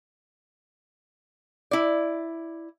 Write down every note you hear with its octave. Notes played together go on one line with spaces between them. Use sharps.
E4 D5